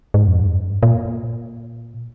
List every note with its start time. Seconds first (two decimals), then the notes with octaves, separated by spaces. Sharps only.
0.14 G#2
0.28 F2
0.41 G2
0.83 A#2